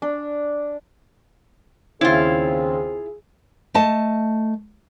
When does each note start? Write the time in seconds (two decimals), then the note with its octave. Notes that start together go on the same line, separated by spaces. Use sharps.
0.02 D4
2.01 D#2 C#3 C4 C#4 E4 F4 G#4
3.74 A3 D#5 A5